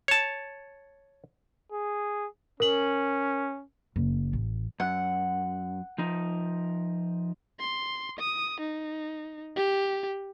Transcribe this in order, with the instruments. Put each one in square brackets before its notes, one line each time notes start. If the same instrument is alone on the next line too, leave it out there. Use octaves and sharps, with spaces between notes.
[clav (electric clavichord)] C#5 A5
[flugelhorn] G#4
[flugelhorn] C#4 [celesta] A#4 F#7
[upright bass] F#1
A1
[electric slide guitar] F#2 [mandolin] F#5
[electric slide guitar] F3 D#4
[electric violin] C6
D#6
D#4
G4